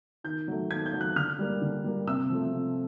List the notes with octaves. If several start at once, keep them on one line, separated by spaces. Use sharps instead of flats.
D#3 G6
F#3 A3
D#3 G#6
G6
F#3 A3
F#6
D3 F6
G3 A#3
D3
G3 A#3
C3 E6
F3 A3
C3